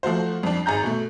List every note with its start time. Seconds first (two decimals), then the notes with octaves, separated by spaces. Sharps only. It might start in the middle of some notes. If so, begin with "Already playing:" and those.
0.03 F3 A3 F#4 C5
0.43 F2 D4
0.66 G#1 G#4 A#5 G6
0.83 B2 A3